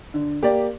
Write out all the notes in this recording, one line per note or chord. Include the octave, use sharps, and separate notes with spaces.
D3
A#3 G4 D5